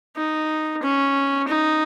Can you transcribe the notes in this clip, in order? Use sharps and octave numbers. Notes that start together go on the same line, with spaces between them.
D#4
C#4
D#4